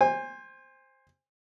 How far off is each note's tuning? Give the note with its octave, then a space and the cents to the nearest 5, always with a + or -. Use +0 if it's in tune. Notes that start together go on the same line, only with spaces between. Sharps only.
C5 +10 G#5 -30